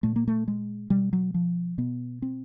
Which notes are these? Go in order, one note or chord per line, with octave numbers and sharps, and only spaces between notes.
A#2 A3
A#3
A3
G#3
B2 G3
F#3
F3
B2 B3
C4